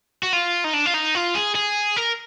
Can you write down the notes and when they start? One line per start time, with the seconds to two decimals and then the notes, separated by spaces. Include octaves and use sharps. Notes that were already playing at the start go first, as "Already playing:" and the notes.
0.23 F#4
0.33 F4
0.64 D#4
0.74 D4
0.86 F4
0.94 D#4
1.15 F4
1.35 G#4
1.55 G#4
1.97 A#4